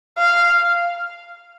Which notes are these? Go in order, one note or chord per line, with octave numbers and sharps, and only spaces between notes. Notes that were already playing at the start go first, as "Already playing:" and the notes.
F5